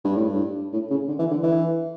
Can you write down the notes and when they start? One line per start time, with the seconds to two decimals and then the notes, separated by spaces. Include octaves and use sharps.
0.04 G2
0.16 A2
0.27 G2
0.73 A2
0.90 C#3
1.08 D3
1.19 E3
1.31 D3
1.43 E3